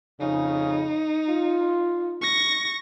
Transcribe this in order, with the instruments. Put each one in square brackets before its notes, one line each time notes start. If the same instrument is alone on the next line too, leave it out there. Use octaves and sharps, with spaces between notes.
[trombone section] F2 C#3 [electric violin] D#4
[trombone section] F4
[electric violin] C#6 A#6